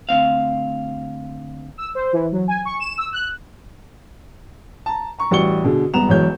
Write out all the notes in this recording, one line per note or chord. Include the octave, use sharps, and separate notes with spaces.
D2 C4 F5
E6
C5
E3
F#3
G#5
C#6
E7
E6
F#6
A5 A#5
A#5 C#6
A1 G3 F#4 C#6 C#7 G7
B2 D3 G#4
E1 C2 B3 A#5 E7 F7
E1 B1 E2 C#5 G6